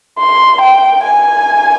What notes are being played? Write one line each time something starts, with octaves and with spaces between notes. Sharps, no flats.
C6
G5
G#5